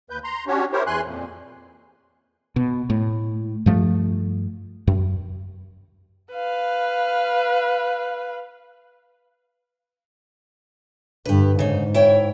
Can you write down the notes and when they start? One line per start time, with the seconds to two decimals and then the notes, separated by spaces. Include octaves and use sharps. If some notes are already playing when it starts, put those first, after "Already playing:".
0.10 D#2 B4 G6
0.24 A#5 C6
0.47 C#4 D4 F#4 G4 C#5
0.73 E4 G4 A#4 C5 C#5
0.87 E2 E3 G#5 C6 F#6
1.05 F2 A#2
2.56 B2
2.90 A2
3.66 G2 F3 A3
4.87 F#2
6.33 B4 F5
11.26 G2 D3 G4 B4
11.59 G#2 C#3 D#4
11.94 E4 C#5 G5